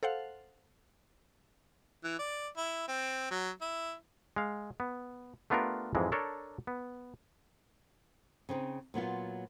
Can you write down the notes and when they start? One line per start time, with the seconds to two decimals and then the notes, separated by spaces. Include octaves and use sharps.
0.03 A4 C5 F5 F#5
2.04 E3
2.19 D5
2.57 E4
2.88 C4
3.31 F#3
3.62 E4
4.36 G#3 F5
4.80 B3
5.50 A3 B3 D4 F4 G4 A#4
5.95 F2 G#2 E3 G#3
6.12 D4 A4 A#4 C#5
6.67 B3
8.49 C#3 C4 D4 D#4
8.94 A#2 F#3 B3 F4